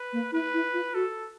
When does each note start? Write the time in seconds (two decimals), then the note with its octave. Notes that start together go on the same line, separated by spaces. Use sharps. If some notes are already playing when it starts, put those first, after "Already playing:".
Already playing: B4
0.13 A#3
0.32 E4 B4
0.54 E4
0.73 F4
0.94 F#4 A4